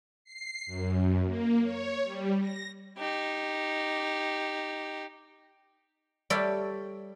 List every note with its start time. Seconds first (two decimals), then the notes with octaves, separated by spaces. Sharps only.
0.24 C7
0.66 F#2
1.25 A#3
1.63 C#5
2.04 G3
2.40 A#6
2.98 D#4 G4
6.30 G3 A4 C#5 D5 E5